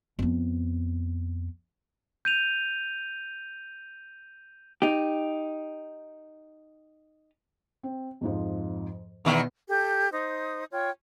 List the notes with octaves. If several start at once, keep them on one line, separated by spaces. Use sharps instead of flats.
F2 B3
G6 D#7 F7
D#4 G4
C4
F2 G#2 F3
E2 B2 D#3 B3 E4
G4 A4 G6
D#4 C5 D#6
F4 C#5 G5